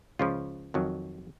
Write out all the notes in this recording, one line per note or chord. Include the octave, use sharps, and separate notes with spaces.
C#2 C#3 F3 F4
F2 D#3 F#3